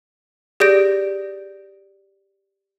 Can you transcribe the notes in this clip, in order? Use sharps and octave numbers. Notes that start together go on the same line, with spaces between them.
G4 G#4 D5 G6 A#6 D7